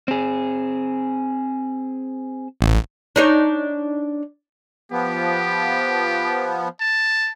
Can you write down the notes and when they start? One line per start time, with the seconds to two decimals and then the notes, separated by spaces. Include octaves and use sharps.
0.08 C4 G#4
2.61 A1
3.16 D4 D#4 C#5
4.92 F3 B3 G4
6.80 A5